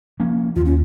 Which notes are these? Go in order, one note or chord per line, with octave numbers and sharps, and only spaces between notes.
F3 A#3 C#4
D#2 F4
C#4